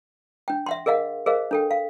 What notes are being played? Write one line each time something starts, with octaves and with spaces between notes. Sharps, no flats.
D4 G5
E5 F#5 C6
G#4 A#4 D#5 F5 F#5
G#4 A#4 C5 D#5 F5
D4 A4 G5
F5